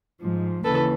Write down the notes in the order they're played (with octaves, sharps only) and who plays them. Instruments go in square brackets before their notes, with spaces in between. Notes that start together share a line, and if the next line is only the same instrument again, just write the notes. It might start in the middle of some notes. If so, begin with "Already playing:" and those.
[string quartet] G#2 F3
D#2 C#3 E3 A4 B4